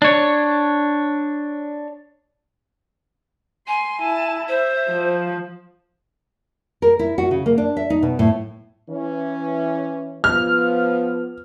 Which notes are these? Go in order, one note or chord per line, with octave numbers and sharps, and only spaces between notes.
D4 C#5
G#5 C6
E4 A5
C5 E5
F3
A#4
E4
F#4
C#3
A#3
D4
E5
D#4
B2
A2
E3 C#4
F3 B3 F6